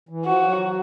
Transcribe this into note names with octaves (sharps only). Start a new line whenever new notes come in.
E3
F3 F#4
F#3